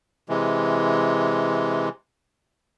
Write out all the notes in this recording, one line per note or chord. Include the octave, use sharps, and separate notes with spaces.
C3 E3 G#3